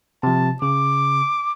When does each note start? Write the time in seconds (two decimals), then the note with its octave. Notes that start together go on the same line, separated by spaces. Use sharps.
0.23 C3 F3 A5
0.62 C#3 D6